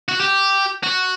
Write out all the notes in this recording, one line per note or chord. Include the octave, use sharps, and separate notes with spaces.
F#4
G4
F#4